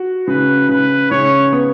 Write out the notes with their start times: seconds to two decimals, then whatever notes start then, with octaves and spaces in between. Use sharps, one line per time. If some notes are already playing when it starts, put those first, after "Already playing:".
Already playing: F#4
0.28 C#3 B4
0.69 C#3 B4
1.11 C#3 C#5
1.53 B3